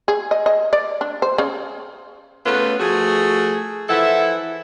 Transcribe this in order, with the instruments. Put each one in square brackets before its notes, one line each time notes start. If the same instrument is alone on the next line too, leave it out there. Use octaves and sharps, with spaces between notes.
[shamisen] G#4
D#5
D#5
D5
D4
C5
C#3
[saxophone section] C#3 A3 B3 F4 A4 B4
F3 A3 F#4 G#4
E3 F3 E4 A4 E5 F#5